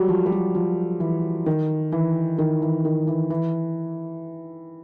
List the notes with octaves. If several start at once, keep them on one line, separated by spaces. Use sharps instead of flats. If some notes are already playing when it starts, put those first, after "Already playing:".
Already playing: F#3 G3
F3
G3
F#3
F3
E3
D#3
E3
D#3
E3
D#3
E3
E3